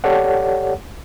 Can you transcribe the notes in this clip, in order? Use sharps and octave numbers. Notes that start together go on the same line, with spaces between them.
G4 A4 C#5 D5 F#5